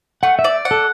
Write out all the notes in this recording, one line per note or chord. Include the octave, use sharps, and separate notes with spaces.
A3 F#5
E5
D5
F#5
A4